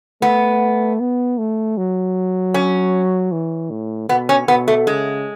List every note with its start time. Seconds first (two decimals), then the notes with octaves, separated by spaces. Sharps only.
0.22 A3 B3
1.00 B3
1.38 A3
1.77 F#3
2.54 C#4
3.32 E3
3.70 A2
4.09 B2 B3
4.29 C#4
4.48 B2 B3
4.68 A3
4.87 C#3 G#3